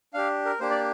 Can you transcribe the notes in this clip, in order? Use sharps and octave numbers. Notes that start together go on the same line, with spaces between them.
D4 G4 F5
A#4
A#3 D4 G4 C5
D5